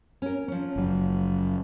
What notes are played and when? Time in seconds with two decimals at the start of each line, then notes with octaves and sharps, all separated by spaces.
0.22 C#4 A#4
0.48 F3 C#4
0.76 F#1 F#3